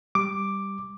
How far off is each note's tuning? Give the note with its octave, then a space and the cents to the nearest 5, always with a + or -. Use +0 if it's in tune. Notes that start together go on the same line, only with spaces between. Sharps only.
G3 +0 D6 +0